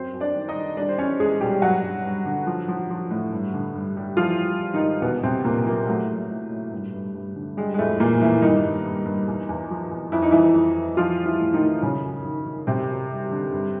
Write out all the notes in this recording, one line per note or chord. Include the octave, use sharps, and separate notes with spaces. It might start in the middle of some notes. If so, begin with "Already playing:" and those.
Already playing: F#2 C4 C5
F#2
D4 D5
D#3
D#4 D#5
D#3
G3 D4 D5
C5
E2 C#4 C#5
E2 G#3 G#4
B2 G3 G4
G2 F#3 F#4
G2
G2
D3
F3
F3
F3
A2
G2
D3
G2
G3
E3 F3 F4
G3
G3
D#3 D#4
G#2
E2 B2 B3
E2 C3 C4
E2 A#2 A#3
A#2 F#3 A#3
A2 F#3 A3
F#3
A2
A2
G2
G2
G2
D3
G3 G#3
G#3
F2 A2 A3
A#2 E3 A#3
F2 E3 E4
G2 D#3 D#4
G2
G2
G2
E2
E2
F3
E2
F2 E4
D#4
F2 E3 E4
F2
F2
E3 F3 F4
G3
E3 E4
A2
D#3 D#4
A2
F#2 C#3 C#4
F#2
D#3
D#3
F#2 C3 C4
F#2
G3
D3
G2